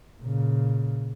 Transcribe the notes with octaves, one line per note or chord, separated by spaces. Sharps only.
A#2 C#3